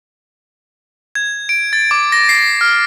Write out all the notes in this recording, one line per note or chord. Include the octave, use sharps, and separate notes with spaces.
G#6
D7
A6
D6
A#6
C7
F6